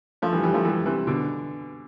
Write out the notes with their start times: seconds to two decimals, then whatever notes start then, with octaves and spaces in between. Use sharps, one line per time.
0.22 F3 A3
0.33 E3 G3
0.43 E3 G3
0.54 F3 A3
0.64 E3 G3
0.85 C3 E3
1.07 B2 D3